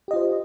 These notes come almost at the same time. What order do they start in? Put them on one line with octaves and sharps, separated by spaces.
G4 D#5 F4 C5